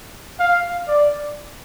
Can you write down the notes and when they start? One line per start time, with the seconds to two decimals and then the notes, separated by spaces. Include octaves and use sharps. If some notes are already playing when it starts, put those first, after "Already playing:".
0.39 F5
0.88 D5